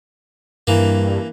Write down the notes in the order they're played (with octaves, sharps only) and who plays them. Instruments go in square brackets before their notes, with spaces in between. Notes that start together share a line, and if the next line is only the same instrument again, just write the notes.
[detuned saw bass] G2 [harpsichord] E3 A#3